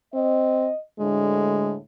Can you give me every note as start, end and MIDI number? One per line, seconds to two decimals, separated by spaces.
0.14 0.69 60
0.14 0.77 75
0.99 1.77 38
0.99 1.77 45
0.99 1.77 50
0.99 1.75 56